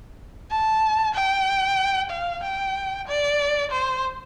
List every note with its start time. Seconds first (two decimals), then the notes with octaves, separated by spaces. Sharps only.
0.51 A5
1.15 G5
2.11 F5
2.43 G5
3.07 D5
3.72 C5